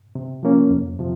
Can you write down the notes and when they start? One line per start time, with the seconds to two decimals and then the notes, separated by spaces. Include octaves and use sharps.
0.15 C3
0.43 F3 A#3 C#4
0.71 F2
0.99 C3 F3